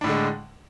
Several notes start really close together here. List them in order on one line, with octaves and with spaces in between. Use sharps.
D4 A2 D3 G#3